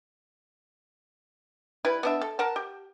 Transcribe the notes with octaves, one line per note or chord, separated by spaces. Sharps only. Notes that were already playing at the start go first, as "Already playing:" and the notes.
G3 E4 B4
B3 D4 E5
A4
A#4 F#5 A5
G4